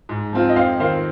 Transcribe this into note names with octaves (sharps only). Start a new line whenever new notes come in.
G#2
F3 C4 F4
D#5
F2 C5 F5
D#3 C4 F4 C5 F5